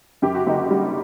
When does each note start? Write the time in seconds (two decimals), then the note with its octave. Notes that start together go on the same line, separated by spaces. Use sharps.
0.22 F#2 G4
0.35 F#4
0.46 F#1 D#4
0.58 F#4
0.71 G3